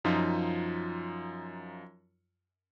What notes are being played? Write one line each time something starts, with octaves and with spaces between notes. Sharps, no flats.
F#2 F3 D#4 F4